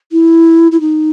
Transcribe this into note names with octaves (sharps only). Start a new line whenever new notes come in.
E4
E4
D#4